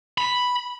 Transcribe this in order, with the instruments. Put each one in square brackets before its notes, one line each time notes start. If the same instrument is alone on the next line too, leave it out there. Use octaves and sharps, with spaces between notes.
[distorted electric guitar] B5